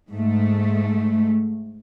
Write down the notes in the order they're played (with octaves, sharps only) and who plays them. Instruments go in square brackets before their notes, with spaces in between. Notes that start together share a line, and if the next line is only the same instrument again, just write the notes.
[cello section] G#2 A3